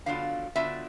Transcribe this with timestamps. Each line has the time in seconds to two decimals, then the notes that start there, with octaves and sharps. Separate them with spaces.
0.06 D3 F#3 B3 D4 F4 F5
0.55 D3 F#3 B3 D4 F4 E5